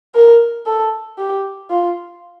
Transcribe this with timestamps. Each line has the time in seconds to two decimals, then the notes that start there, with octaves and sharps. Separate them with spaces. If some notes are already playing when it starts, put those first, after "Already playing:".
0.15 A#4
0.66 A4
1.18 G4
1.70 F4